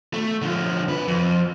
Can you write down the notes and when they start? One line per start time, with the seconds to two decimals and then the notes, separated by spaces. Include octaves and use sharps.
0.14 A3
0.42 D3 F3
0.88 C3 B4
1.08 F2